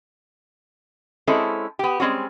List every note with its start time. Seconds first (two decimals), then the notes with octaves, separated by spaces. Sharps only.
1.27 G#3 C4 C#4 E4 A4
1.79 B3 G4
2.00 G3 G#3 C4 C#4 F#4